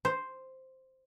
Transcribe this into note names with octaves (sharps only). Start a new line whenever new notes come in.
C5